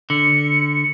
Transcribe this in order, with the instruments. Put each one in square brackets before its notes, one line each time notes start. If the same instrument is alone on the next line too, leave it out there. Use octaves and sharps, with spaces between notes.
[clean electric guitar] D3 [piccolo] C#7